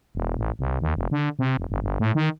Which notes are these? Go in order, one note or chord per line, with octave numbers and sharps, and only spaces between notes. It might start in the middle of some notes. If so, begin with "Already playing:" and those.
E1
A1
C2
D#2
F1
D3
C3
F1
G1
G1
A2
D#3